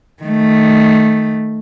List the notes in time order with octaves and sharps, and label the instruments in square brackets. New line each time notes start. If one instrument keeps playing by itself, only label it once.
[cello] D#3 A3